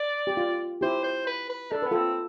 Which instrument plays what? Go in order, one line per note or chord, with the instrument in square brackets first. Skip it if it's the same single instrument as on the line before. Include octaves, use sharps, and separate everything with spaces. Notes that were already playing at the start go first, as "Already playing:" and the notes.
Already playing: [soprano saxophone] D5
[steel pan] G4
F4
[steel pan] E4 G4 [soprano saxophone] C5
[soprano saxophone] C5
B4
B4
[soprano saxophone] D4 [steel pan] A4
[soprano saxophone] B3 [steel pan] B4
[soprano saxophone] C4 [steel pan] F4 A4